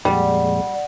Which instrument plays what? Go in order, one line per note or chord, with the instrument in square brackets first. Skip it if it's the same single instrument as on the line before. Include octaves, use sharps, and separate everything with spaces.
[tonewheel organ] F2 A#2 G#3 [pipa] G3 [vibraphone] D5 F#5